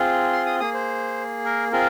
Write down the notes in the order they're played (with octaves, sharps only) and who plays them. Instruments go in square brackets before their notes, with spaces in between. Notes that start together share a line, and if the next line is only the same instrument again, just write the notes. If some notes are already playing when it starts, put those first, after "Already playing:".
Already playing: [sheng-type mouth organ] C4 F4 G#4
C6
D#6
A#3 G#4 D#6
C5
A#4
C4 F4 G#4 A#4